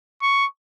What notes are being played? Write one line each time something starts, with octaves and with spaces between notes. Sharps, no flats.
C#6